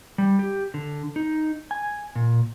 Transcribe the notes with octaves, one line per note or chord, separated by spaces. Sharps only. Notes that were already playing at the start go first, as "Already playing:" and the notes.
G3
G4
D3
D#4
G#5
A#2